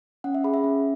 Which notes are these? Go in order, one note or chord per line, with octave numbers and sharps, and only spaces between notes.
C#4 F#5
E5
G#4 B5
E5
C#4